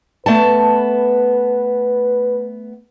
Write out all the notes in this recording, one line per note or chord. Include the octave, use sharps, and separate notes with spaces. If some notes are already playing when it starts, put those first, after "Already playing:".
A3 B3 B4 A5